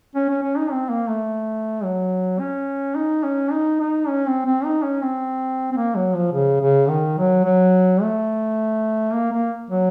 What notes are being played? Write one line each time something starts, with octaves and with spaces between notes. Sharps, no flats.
C#4
C#4
C#4
D#4
C4
A#3
A3
F#3
C#4
D#4
C#4
D#4
D#4
C#4
C4
C4
D#4
C#4
C4
C4
A#3
F#3
F3
C#3
C#3
D#3
F#3
F#3
A3
A#3
A#3
F#3